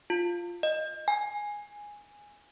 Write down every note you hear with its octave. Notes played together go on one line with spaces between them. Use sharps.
F4
D#5
G#5